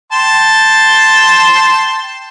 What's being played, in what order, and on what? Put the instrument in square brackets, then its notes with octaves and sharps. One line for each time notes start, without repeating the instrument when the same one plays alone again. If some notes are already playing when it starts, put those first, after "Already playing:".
[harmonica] G5 A5 C6